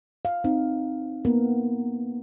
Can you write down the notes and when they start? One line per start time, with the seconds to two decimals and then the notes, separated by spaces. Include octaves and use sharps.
0.25 F5
0.44 C4 D#4
1.25 A#3 B3 A#4